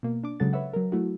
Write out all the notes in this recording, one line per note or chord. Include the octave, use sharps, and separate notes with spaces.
B2 A#3
D4 D6
C#3 F#3 G#3 A4 F#5 A6
B4 C#5 E5 F#5
F#3 A#4
F#3 A3 E4 F#4